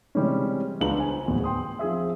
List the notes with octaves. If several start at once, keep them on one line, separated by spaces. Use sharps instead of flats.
C3 E3 G3 G#3 C#4
C#2 B3 D4 F4 A#5 F#7
C5 G#5
D1 E2 F#4
G5 C6 D#6
F3 C4 G#4 E5